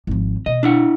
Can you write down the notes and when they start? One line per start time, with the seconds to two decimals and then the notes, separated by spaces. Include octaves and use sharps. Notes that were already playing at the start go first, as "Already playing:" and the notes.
0.07 G#1 F3
0.46 B2 D#5
0.63 D4 E4 F#5